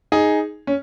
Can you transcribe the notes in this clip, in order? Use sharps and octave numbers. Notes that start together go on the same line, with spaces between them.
D#4 G#4
C#4